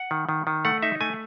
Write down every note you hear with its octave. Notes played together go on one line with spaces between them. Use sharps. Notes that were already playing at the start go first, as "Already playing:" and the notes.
Already playing: F#5
D#3
D#3
D#3
A3 F#5
D#4 E5
A3 G#5